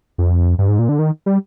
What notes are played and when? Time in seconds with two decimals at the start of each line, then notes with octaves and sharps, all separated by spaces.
0.18 F2
0.58 G2
0.69 G#2
0.79 A#2
0.89 D3
0.99 D#3
1.26 G3